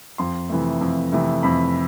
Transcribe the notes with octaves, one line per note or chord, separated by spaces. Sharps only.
F2 C6
C3 E3 A3
F2
C3 E3 A3
F2 B5